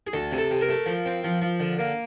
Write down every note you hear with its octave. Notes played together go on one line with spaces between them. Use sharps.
G#4
D2 A4
C3
A4
C3
A#4
A3
F3
C4
F3
F3
D3
A#3